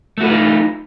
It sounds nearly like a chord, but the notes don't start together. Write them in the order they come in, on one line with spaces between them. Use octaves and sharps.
A3 F#4 B4 F4 D#4